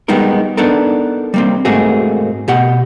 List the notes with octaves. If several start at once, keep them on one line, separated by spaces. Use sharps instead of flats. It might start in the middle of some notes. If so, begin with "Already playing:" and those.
G3 G#3 B3 D#4 A#4
B3 D4 D#4 A4 A#4
G3 A#3 C4
G#2 A3 A#3 C4 F#4 G#4
B2 G4 F#5